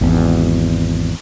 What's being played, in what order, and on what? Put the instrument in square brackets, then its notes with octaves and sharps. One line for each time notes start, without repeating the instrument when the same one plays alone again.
[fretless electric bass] G#1 E2